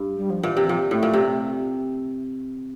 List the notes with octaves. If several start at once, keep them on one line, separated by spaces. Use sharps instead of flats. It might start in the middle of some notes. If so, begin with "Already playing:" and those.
Already playing: G2
G3
F3
A#2 E3
C3
E3
A#2 F3
A2 A3
A#2
C3